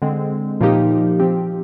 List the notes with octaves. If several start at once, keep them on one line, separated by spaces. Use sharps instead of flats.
D3 G#3 C4
A#2 F3 A#3 D#4 G4
F3 C4 G4